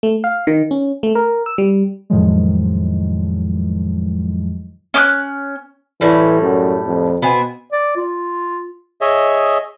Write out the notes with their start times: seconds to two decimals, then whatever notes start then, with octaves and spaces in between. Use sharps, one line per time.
0.03 A3
0.24 F5
0.47 D#3
0.71 C#4
1.03 A3
1.15 A#4
1.46 E6
1.58 G3
2.10 F2 A2 D#3 F3 F#3 G#3
4.94 C#4 D6 F#6
6.01 A2 E3 G3
6.42 F#2
6.86 F2
7.22 B2 B3 C4 G#5
7.72 D5
7.96 F4
9.01 G#4 C#5 D#5 E5